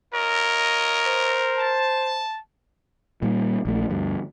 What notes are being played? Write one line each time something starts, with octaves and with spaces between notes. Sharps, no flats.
F4 A#4 C#5 D#5
C5
A5
A#2 G3
A#1 A3
D2 G2